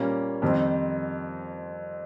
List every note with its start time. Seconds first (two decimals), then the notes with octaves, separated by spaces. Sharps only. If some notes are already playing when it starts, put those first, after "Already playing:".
Already playing: A#2 G3 A#3 C#4
0.42 F2 D#3 G3 C4